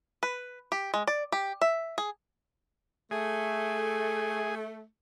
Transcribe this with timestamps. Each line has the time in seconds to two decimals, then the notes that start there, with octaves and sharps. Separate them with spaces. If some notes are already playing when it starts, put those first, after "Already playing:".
0.23 B4
0.72 G4
0.94 G#3
1.07 D5
1.32 G4
1.61 E5
1.98 G#4
3.11 A3 G#4